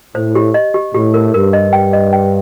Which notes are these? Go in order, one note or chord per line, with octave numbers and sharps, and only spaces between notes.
A2 C5
G4
D#5
G4
A2 G4
A#4
G2 A#4
D#5
G5
D#5
G5